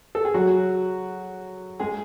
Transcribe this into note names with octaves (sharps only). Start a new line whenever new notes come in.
A4
G#4
F#3 F#4
G#3 G#4